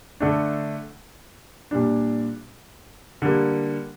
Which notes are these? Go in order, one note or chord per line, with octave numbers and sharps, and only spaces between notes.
D3 A3 D4
A#2 G3 D4
D3 G3 A#3